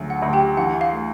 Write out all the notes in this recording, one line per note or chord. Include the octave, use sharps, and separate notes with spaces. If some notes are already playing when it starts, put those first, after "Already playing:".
Already playing: D2 C#3 F#3
F#5
D2
G4 G5
E3 F#5
F5
A3